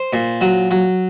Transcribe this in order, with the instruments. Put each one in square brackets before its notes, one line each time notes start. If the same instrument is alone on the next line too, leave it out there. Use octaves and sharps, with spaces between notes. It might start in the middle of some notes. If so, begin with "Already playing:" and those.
Already playing: [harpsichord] C5
A#2
F#3
F#3